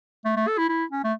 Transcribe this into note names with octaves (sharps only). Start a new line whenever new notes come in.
A3
A3
A4
E4
E4
C#4
A3